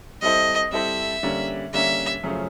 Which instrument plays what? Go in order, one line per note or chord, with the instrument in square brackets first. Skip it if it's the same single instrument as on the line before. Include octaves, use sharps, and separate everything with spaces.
[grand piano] G3 C4 E4 A4 C5 [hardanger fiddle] D#5
[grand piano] G3 C4 E4 A4 C5 [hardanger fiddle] E5
[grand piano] D3 G3 A#3 C#4
[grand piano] D3 G3 A#3 C#4 [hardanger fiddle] E5
[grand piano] F#2 C#3 F3 A3 C#4